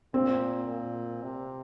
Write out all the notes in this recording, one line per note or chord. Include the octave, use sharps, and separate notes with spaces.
A#2 C4
A#2
C3